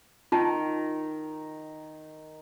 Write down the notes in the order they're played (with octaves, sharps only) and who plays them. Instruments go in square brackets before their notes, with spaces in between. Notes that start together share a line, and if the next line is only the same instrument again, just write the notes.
[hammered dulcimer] D#3 [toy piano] F4 A5